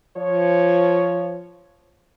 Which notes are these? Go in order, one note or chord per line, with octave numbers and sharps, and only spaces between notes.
F3 C#5